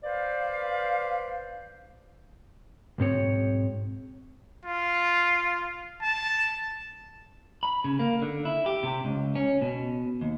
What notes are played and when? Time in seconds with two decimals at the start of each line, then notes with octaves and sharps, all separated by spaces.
0.04 B4 C5 D5 F5
2.98 B1 G#2 C4 C#5
4.65 F4
6.02 A5
7.63 B5
7.84 C#3
7.99 A#3
8.22 D3
8.45 E4
8.66 G4
8.83 C3
9.05 C#2
9.35 C#4
9.62 B2
10.21 D#2